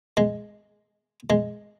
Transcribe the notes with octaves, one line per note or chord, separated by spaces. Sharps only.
G#3
G#3